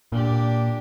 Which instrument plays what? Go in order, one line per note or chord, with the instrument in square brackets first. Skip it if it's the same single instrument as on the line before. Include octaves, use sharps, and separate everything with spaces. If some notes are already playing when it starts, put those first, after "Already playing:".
[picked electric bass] A#2 [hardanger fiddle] D4 G4